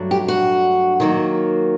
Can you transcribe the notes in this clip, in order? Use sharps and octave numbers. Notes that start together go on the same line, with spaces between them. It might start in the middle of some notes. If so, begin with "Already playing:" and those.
Already playing: G2 F#3 A3 D4
G4
F#4
D#3 F#3 A#3